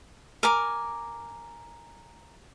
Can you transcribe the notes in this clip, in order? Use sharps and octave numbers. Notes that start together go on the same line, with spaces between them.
A#4 G#5 D6